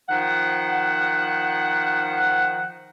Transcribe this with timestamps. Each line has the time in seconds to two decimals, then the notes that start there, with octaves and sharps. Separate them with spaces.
0.09 D#3 F3 F#5